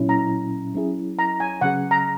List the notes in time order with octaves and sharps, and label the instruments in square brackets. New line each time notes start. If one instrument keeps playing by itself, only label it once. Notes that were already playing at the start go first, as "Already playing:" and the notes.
Already playing: [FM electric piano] A#2 F#3 C#4 E4
[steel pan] A#5
[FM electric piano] F#3 C#4 E4 G#4
[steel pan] A#5
G#5
[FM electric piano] C#3 F#3 C#4 G#4 [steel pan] F#5
[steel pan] A#5